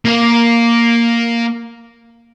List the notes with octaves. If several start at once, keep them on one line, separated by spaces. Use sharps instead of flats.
A#3 F5